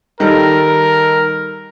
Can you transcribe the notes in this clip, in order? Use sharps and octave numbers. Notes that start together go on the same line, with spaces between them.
D#3 G3 A4 A#4